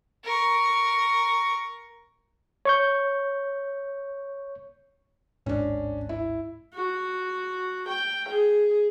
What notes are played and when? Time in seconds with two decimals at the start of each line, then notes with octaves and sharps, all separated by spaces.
0.25 A#4 C#6
2.65 C#5 C#6 G6
5.46 D1 G#1 G#2 C#4 D4
6.09 E4
6.74 F#4
7.89 G5
8.29 G#4